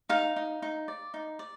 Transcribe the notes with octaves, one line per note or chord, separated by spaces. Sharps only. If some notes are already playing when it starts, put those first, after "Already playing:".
D#4 F5
D#4
D#4
D5
D#4
D5